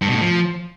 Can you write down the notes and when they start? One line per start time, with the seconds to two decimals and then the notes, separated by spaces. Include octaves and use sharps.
0.01 G2
0.08 B2
0.15 A2
0.21 F3